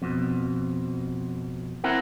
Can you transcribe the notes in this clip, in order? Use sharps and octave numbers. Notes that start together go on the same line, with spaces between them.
F2 B2
C4 E4 A#4 F#5